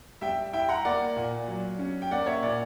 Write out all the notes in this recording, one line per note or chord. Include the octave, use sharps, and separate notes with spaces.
G3 E5 G5
E4 E5 G5
F#5 A#5
A#3 D5 F#5
A#2
F#3
C#4
G5
A#3 D5 F#5
C#5 E5
A#2 D5 F#5